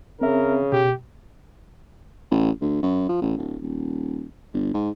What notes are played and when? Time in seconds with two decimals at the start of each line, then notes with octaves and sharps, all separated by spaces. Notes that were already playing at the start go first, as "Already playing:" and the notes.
0.21 C#3 C4 A#4 E5
0.72 B2 G4
2.31 A1
2.61 D2
2.83 F#2
3.09 F3
3.22 A1
3.37 D1
3.62 D#1
4.53 G1
4.74 G#2